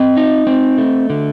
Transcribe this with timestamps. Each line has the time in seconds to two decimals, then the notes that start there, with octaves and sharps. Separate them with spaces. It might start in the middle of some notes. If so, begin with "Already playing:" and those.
Already playing: C4 D#5
0.17 D#4
0.47 C4
0.78 A3
1.10 D3